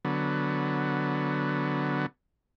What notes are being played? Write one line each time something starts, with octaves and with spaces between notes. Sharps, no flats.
D3 F#3 B3